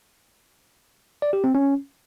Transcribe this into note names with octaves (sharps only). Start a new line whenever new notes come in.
D5
G4
C4
C#4